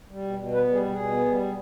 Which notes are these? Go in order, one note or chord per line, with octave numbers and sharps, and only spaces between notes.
G3
B2
B2
B3 B4
G3 G#4
B2
B2 G#4
B3
G3
B2